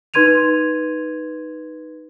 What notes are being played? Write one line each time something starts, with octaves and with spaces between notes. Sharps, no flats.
D#4 B4 C6 G#6 D#7 F7